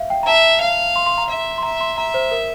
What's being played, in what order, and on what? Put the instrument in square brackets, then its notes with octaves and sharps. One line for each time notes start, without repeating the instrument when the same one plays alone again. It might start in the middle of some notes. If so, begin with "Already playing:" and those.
Already playing: [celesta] E5 F5
G5
A#5
[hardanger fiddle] E5 [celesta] A5
[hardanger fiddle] F5
[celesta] C6
C6
A#5
[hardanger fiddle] E5
[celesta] C6
[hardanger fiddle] E5 [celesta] A#5
[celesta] C6
[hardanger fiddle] E5 [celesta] A#5
[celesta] C5
A#4